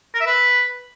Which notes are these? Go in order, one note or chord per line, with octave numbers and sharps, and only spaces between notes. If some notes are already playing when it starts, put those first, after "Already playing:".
A#4
E5
B4